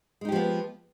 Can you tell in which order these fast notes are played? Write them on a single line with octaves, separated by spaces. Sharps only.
G#3 D#4 G4 F3 B3